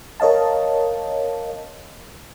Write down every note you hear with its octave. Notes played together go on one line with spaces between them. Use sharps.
A#4 C#5 D#5 F5 A5